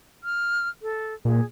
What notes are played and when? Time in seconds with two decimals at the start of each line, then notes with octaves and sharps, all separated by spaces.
0.24 F6
0.82 A4
1.25 A#2 G#4